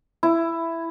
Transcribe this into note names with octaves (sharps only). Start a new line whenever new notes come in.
E4